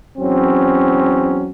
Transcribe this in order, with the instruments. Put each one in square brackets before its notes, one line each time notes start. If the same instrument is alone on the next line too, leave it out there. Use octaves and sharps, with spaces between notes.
[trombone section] E2 F#3 C4 C#4